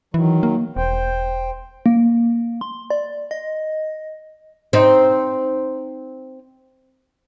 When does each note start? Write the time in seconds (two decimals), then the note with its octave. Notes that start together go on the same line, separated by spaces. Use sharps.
0.14 D#3 E3 F#3
0.43 A#3
0.76 E1 C5 G5
1.86 A#3
2.61 C6
2.90 D5
3.31 D#5
4.73 C4 D#4